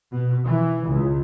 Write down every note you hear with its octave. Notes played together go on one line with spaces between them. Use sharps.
B2
E3
C#2